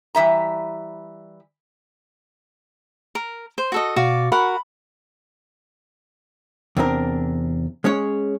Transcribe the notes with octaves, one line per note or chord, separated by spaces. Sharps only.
E3 G3 E5 A#5
A#4
C5
F#4 A4 D#5
B2 F#4 D5 F5
F#4 A#4 F#5 B5
E2 C3 C4 D4 F4 A#4
G#3 C#4 G#4 C#5